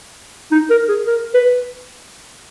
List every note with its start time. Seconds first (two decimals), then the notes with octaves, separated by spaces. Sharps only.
0.52 D#4
0.70 A#4
0.89 G#4
1.07 A#4
1.34 B4